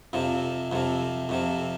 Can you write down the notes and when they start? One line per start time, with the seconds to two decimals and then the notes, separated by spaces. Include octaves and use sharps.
0.13 F2 C3 F3
0.72 F2 C3 F3
1.29 F2 C3 F3